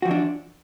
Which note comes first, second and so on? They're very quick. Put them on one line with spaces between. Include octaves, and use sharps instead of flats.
F#4 F3 E3 D4